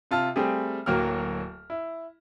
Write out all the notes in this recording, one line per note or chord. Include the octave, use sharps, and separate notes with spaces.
C3 F4 A5 F6
G3 A3 C4 G4 G#4
D1 F#3 A#3 G5 F6
E4